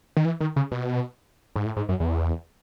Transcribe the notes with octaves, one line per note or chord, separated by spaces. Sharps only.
D#3
E3
D#3
C#3
B2
G#2
A2
G#2
F#2
E2